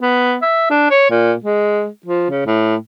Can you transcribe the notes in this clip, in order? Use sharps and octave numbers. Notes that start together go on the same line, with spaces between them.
B3
E5
D4
C#5
A#2
G#3
F3
C#3
A2